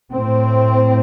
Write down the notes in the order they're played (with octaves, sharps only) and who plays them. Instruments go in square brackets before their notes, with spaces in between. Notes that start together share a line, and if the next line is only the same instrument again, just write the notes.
[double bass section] A2 C4